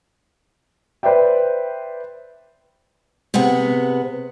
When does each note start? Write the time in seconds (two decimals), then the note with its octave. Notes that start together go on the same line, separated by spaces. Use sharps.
1.03 B4 C5 D5 E5 G5
3.34 C3 B3 G#4 F#5